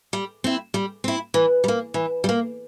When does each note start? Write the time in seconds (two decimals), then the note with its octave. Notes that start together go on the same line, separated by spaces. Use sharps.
0.13 G3
0.44 C4 E4
0.74 G3
1.04 C4 E4
1.34 E3
1.64 G3
1.68 A#3
1.94 E3
2.24 G3
2.29 A#3